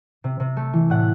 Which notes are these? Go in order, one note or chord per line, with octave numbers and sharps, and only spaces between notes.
C3
C3
A3
E3
A2 F#5